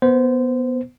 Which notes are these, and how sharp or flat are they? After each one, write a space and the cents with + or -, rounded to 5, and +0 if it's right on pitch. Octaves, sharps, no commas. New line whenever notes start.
B3 -5 C5 -20